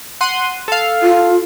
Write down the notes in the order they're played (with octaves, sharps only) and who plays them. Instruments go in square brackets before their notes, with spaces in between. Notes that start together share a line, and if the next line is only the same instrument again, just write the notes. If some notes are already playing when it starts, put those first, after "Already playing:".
[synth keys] F#5 C6 D#7
A4 F5
[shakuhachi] F4